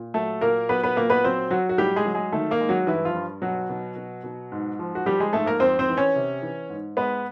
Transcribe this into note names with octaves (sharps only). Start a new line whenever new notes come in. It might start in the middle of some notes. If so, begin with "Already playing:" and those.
Already playing: A#2
F#3 A3 A4
A#2 A#3 A#4
F#3 B3 B4
B3 B4
A#2 A#3 A#4
B3 B4
F#3 C4 C5
F#3 F#4
F#4
A2 G3 G4
G#3 G#4
F#3
G#3 G#4
D#3 A3 A4
A#3 A#4
G#3
F#3 F#4
G2 E3 E4
F3 F4
G2
B2 F#3 F#4
B2
B2
B2
G#2
F3
F#4
F3 G3 G4
G#3 G#4
G#2 A3 A4
A#3 A#4
F2 C4 C5
C4 C5
E3
C#4 C#5
C3
E3
G#2
G#3 B3 B4